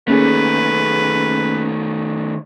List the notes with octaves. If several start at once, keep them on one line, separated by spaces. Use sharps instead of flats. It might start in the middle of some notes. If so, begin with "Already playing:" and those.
D#3 A3 A#3 C#4 G#4 B4